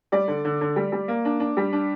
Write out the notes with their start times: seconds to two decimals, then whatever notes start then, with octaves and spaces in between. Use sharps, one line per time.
0.12 G3 D5
0.28 D3
0.45 D3
0.61 D3
0.76 G3
0.92 G3
1.08 A#3
1.25 D4
1.40 D4
1.57 G3
1.73 D4